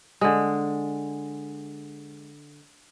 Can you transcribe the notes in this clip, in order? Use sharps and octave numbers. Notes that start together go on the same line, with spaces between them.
D3 G#3